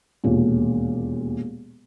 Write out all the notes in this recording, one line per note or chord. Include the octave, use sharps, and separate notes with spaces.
E1 D#2 A#2